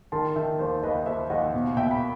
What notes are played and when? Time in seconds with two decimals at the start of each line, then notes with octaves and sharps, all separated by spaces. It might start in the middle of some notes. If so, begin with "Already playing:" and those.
0.12 D#3 A5 C6
0.36 D#3 E5 G5
0.59 D#2 C5
0.83 D#2 B4 D#5
1.06 D#2 C5 E5
1.30 D#2 D#5 F#5
1.54 B2
1.77 B2 E5 G5
1.91 B5